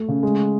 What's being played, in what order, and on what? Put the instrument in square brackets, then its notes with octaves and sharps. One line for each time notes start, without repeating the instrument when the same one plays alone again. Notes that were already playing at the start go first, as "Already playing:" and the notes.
Already playing: [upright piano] A3
[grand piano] C#3
G#3